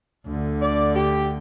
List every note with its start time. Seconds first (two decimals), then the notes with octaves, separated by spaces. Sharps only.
0.27 D2 D3
0.60 D5
0.95 G4